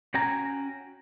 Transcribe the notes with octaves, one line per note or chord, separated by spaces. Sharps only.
C#4 F#4 G5 G#5 A#5